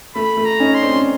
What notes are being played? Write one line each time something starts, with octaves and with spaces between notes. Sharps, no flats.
A3 B5
A3
A#5
C#4 D#4
C6
C4 D4
C#4